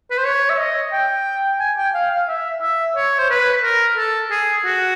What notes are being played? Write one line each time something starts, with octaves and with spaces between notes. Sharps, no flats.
B4
C5
C#5
E5
D#5
G5
G#5
G5
F5
F5
E5
E5
C#5
C5
B4
A#4
A4
G#4
F#4